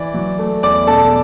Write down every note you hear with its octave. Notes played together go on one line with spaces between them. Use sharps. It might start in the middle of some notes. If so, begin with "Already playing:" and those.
Already playing: E3 D5
F#3
A3
E2 D5 D6
B2 A4 A5